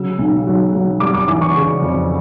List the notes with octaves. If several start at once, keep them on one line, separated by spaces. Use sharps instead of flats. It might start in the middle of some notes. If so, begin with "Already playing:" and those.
Already playing: C#3 F#3 E6
B1
F#3
F#3
G3 D6
D6
E3 D6
C#6
C#3
F2